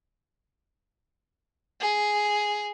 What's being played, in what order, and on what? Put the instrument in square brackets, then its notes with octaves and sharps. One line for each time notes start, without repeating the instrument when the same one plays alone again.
[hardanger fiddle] G#4